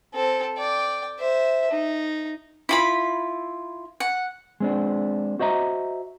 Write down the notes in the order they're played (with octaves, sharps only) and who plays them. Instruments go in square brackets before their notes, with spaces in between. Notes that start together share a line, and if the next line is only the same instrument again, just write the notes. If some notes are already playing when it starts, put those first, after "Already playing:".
[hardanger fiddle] C4 A4
D5 G5
C5 E5
D#4
[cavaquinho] E4 F4 B5
F#5
[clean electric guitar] G#3 C4 D4
F#4 C5 D#5 E5 A#5